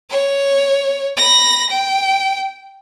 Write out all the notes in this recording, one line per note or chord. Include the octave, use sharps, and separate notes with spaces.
C#5
B5 A#6
G5